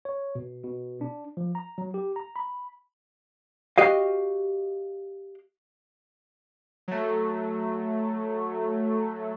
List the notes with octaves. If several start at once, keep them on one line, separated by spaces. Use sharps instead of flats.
C#5
B2
B2
D4
F3
A#5
F#3
G4
A#5
B5
F#4 G4 D#5 F5
F#3 A3